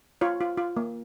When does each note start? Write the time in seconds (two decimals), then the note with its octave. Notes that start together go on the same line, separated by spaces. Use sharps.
0.21 F4 C#5
0.41 F4
0.58 F4
0.77 A#3